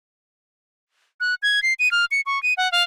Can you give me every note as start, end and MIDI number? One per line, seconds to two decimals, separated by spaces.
1.20 1.35 90
1.43 1.62 92
1.63 1.74 96
1.79 1.91 99
1.91 2.05 89
2.11 2.21 97
2.26 2.41 85
2.43 2.54 99
2.57 2.70 78
2.72 2.83 77